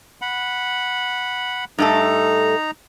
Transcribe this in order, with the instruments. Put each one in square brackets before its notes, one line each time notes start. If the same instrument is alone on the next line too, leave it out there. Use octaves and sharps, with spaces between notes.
[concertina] F#5 B5
[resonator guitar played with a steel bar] G2 A3 A4 [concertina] D#4 A#5